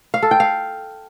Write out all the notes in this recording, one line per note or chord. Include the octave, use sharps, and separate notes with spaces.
F5
A4
G5
F5